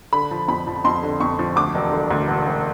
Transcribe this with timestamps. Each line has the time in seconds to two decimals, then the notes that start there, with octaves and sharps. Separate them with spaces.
0.12 D3 B5
0.31 F3
0.48 F2 B5
0.67 F3
0.84 F2 C6
1.03 D3
1.20 F2 C#6
1.39 F3
1.56 D2 D6
1.75 E1
1.92 D3
2.11 D2
2.28 E1
2.46 E1